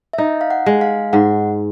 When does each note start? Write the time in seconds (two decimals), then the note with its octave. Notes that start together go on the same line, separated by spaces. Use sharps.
0.13 E5
0.18 D#4 D#5
0.41 F5
0.50 F#5
0.66 G#3
0.81 F5
1.13 G#2 F#5